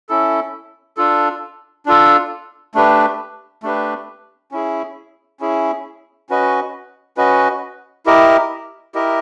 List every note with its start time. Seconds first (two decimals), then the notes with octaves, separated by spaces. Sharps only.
0.09 C#4 E4 A4
0.97 D4 F4 A4
1.86 D4 F4 A4
2.75 A3 D4 G4 B4
3.63 A3 D4 G4 B4
4.52 C#4 E4 G#4
5.40 C#4 E4 G#4
6.30 C#4 F#4 B4 D#5
7.17 C#4 F#4 B4 D#5
8.06 E4 G4 A#4 D#5
8.95 E4 G4 A#4 D#5